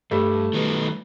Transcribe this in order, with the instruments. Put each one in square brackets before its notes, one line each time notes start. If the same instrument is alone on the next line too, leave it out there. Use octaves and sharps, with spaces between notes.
[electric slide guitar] G2 [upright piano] G3 A3
[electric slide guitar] D#3 F#3 B3